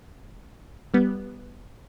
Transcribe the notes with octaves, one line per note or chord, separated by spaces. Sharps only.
G3 B3